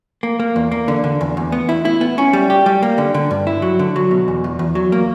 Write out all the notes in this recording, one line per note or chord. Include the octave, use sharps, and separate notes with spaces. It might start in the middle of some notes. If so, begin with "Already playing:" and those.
A#3
A#3
E2
A#3
D3
D3
E2
E2
B3
E4
E4
B3
C#4
G3
G4
G3
A#3
D3
D3
G2
E4
F#3
D3
F#3
B2
E2
E2
E2
F#3
A#3